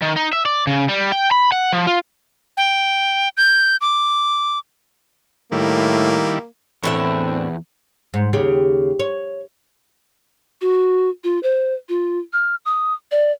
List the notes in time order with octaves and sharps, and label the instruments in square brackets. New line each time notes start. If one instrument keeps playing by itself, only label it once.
[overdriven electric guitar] D#3
D#4
E5
D5
C#3
G3
G5
B5
F#5
F3
F4
[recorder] G5
G6
D6
[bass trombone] A2 [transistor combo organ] D#3 G3 E4 [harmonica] A#3
[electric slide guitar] E2 [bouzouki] A2 D3 E5 [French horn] C4
[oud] G#2
D#2 C#3 G4
C#5
[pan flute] F#4
F4
C5
F4
F6
D#6
D5